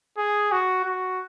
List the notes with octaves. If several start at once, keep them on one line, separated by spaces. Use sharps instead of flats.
G#4
F#4
F#4